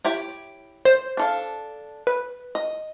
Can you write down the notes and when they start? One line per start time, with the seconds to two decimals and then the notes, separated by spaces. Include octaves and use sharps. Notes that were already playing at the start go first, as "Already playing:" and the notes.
0.05 E4 G4 C#5
0.85 C5
1.17 D4 A4 F5
2.07 B4
2.55 D#5